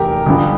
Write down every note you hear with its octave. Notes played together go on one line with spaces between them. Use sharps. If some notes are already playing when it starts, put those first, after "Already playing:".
Already playing: F1 E2 G3 G4 A#4
G1 G2 F3